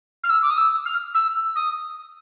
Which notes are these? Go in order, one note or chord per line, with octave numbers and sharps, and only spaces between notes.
F6
E6
D6
D#6
E6
F6
E6
D#6